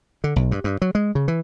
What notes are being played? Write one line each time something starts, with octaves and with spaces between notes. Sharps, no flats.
D3
B1
G2
G2
F#3
G#3
C#3
E3